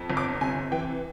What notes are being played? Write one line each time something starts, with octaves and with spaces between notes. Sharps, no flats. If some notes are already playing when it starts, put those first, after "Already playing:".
Already playing: F2
G1
D6
C3 G#5
E3 G5